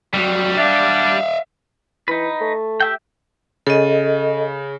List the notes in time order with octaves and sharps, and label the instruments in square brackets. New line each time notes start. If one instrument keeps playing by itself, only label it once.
[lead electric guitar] F2 F#3 [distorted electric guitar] G3
[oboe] D4 [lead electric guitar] E5 F5
[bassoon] E3 [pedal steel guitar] D#4 B4
[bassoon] A3
[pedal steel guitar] G4 E5 G5
[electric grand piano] C#3 [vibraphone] A4 D#5